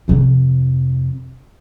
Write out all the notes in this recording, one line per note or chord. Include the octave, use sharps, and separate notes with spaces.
F2 C3